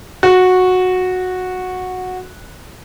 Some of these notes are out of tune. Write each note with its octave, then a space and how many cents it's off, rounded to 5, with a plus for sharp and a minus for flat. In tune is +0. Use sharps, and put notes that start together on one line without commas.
F#4 -10